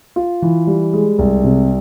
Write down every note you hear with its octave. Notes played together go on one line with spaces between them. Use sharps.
F4
E3
G3
G#3
C2
C3